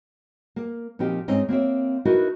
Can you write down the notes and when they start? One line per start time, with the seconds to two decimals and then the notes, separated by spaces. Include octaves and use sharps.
0.56 A#3
0.99 A#2 F3 C4 D#4 G4
1.28 G#2 C4 C#4 D#4
1.49 A#3 C4 C#5 E5
2.05 D#4 E4 F#4 A#4 B4 D#5